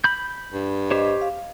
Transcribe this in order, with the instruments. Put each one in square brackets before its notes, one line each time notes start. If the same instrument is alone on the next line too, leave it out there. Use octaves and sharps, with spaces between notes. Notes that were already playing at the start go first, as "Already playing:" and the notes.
[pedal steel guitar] B5 G6
[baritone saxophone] G2
[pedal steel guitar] G4 C5 C#5 [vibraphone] D#5
[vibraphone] F5